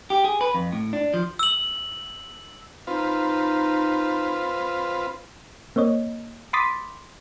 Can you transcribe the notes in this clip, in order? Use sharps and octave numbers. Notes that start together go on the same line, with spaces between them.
G4
G#4
B4
F2
A2
D4
F3
E6 F#7
C4 D#4 F4 B4
A#3 C4 C#5 D#5
B5 C6 D6 D#6 A6 B6